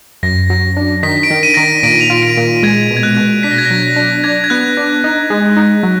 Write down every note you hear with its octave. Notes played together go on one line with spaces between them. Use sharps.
F#2 A#6
F#3
D4
D#3 B6
D7
D#3
D#7
D#3 A#6
B6
A#2 D7
F7
F4 D#7
D7
A#2
G#3 G#6
B2
G#6
F#6
B2
D4 B6
A#6
G#6
A#6
F#3
D4
D4 G#6
G#6
B3 F#6
D4
D#4
G#3
D#4
F#3